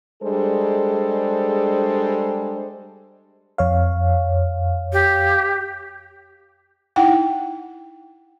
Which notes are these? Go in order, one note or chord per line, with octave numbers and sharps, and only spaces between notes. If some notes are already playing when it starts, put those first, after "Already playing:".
G3 G#3 D4 G#4 A4 C5
F2 C#5 F5
G4
D#4 E4 F#5 G5